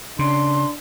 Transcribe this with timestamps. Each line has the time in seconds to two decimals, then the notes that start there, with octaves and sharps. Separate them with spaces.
0.19 C#3 D4 C6